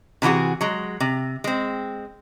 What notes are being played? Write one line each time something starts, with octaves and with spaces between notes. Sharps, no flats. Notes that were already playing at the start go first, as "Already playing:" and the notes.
C3 E3 D#4 F#4 G#4
F#3 G#3
C3
G#3 C4